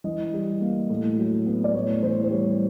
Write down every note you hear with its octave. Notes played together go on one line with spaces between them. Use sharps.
E3 D#5
G3
A#3
A2
F#3
B3
D5
A2 C#5
E3 C5
C5
G3 C#5